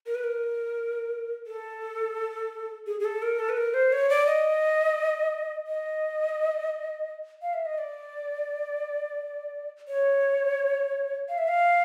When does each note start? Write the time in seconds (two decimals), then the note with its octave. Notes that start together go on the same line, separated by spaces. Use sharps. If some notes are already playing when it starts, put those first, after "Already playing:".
0.06 A#4
0.15 B4
0.24 A#4
1.47 A4
2.87 G#4
3.00 G#4
3.05 A4
3.22 A#4
3.39 A4
3.49 B4
3.57 A#4
3.74 C5
3.93 C#5
4.09 D5
4.27 D#5
5.67 D#5
7.42 F5
7.54 E5
7.66 D#5
7.78 D5
9.88 C#5
11.28 F5
11.38 E5
11.48 F5